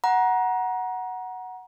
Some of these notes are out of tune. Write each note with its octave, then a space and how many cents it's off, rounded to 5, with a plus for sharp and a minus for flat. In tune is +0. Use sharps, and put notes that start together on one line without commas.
F#5 +0 A#5 +25